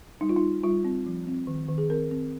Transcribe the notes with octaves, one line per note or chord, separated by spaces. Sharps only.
G3 D#4
F4
D#4
G3
G3 F4
C4
F3
C4
D#3
D#3
G#4
C4 A#4
C4